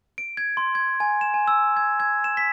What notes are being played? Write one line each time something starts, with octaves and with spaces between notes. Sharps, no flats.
D7
G#6
C6
G#6
G#5
E7
G#5
E6
G#6
G#6
E7
B6